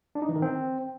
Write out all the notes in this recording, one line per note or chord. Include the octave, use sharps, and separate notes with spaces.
D4
D#4
E3
D#3
C4